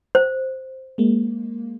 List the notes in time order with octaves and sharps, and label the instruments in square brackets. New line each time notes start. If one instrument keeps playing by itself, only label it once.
[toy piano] C5
[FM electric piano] G#3 A#3